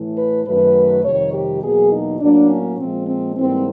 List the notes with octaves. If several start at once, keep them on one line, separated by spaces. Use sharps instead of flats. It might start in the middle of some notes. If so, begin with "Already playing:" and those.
Already playing: A2 E3 A3
B4
F#2 D#3 F#3 A3 B4
F2 C3 D#3 G3 C#5
G4
E2 B2 F#3 A#3 G#4
D#4
A2 F#3 A#3 D4
C#4
A#2 F3 G#3 C4
C4
G#2 E3 G3 A#3 C4